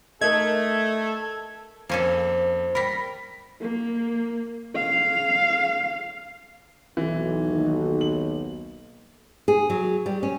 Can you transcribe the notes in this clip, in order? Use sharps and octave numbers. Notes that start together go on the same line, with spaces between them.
A3 A4 A#4 D#5 G#6
F2 A#3 C#4 A4 C5
G3 A#4 B5 A#6 B6
A#3
F5
B1 E3
D#2
F#7
G#4
F#3
G3
C#4